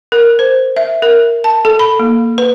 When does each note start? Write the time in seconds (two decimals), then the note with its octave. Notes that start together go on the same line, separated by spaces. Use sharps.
0.12 A#4
0.39 C5
0.76 E5
1.02 A#4
1.44 A5
1.65 A4
1.79 B5
1.99 A#3
2.38 B4